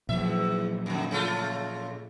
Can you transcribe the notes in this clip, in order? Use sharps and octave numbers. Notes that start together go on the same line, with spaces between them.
E2 A#2 F3 F#3 E5
F2 D3
C#3 A3 F4